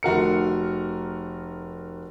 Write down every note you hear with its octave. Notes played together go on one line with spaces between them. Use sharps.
F1 F#4 A#4 C#7